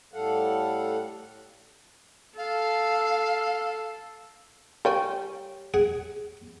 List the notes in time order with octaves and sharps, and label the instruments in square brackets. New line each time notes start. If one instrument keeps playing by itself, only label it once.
[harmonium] A2 G3 A4 F5 F#5
[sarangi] A4 [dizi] F5
[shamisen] G3 G5 G#5 [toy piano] G4 C#5
[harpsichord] G#4 F#5